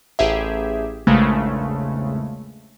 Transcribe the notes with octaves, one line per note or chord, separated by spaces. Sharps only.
A1 G4 G#4 E5
A#1 E2 C#3 G#3 A3